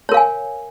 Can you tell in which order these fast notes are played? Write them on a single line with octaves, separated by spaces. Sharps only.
C#5 A#4 F5 G#5